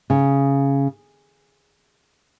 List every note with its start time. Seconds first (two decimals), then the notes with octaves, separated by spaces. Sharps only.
0.10 C#3